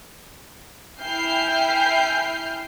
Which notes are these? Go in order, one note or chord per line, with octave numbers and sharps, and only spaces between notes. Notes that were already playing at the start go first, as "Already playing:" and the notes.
E4 G5 G#5 F6 G6 C7